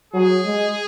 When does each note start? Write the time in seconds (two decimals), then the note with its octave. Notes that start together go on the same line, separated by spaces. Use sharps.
0.14 F#3 G#4
0.45 G#3